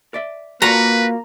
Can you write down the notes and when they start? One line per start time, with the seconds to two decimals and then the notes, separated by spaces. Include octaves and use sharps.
0.14 D5 E5
0.62 A#3 F4 F#4 B4 A#5